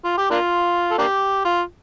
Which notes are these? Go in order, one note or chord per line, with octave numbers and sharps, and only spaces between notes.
F4
G4
A#3 D4 F4
A4
A#3 D4 G4
F4